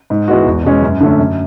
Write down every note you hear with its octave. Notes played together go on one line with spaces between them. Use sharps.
G#2
E3 G#3 B3 F#4
E2
B2 G#3 C#4
F#2
D3 A3 C#4
F#2